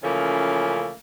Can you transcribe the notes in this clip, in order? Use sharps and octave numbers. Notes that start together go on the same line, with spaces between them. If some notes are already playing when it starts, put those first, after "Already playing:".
C#3 E3 F3 A3 A#3 C#4